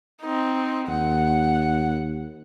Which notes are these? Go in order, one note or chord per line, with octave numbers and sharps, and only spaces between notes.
C4 D#4
D#2 F#5